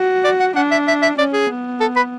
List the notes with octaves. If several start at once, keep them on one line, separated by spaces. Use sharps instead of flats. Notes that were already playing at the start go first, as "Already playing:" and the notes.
Already playing: F#4
D5
F#5
D4 F#5
E5
E5
E5
C#4 D5
G#4
B3
A4
B4